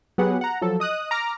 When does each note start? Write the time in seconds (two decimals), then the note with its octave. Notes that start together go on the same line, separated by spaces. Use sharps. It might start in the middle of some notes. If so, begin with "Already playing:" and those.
0.18 F#3 B3 G4 G#4 B4 F#5
0.41 F#5 A#5
0.61 F3 F#3 A4
0.80 D#5 D#6 F#6
1.11 A#5 D6 F6